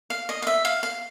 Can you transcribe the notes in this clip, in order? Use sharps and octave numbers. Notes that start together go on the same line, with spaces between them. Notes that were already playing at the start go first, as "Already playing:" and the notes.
F5
D#5
F5
E5
F5
F5